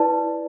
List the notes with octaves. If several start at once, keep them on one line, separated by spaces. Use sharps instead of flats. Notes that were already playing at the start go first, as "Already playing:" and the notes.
Already playing: E4 B4 D5 A5